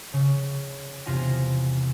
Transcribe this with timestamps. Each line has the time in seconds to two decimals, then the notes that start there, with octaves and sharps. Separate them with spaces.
0.13 C#3
1.06 E2 C3 F4 G#5 A#6